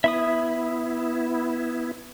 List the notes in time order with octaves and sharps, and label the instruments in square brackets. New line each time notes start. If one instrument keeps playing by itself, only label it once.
[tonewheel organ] B3 E4 [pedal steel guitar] E5 B5 D#6